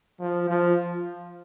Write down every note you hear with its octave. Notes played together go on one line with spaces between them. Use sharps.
F3
F3